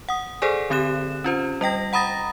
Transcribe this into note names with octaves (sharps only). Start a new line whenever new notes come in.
F#5 D#6
G#4 A4 C5 D5 G#5
D3 C4 G4 F#6 E7
C#4 F4 C5
G3 D#5 G5 A#6
F#5 A#5 B5 D#6 A6 A#6